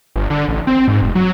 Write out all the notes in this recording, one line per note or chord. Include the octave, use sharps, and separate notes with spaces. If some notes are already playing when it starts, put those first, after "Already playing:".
G1
D3
A1
C4
G#2
F1
F#3